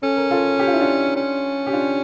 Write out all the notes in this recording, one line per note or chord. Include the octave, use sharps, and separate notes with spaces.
C#4 A4
A#4
F4 A4
G4
F4
E4
D4 F4
C#4
G4
D4 F4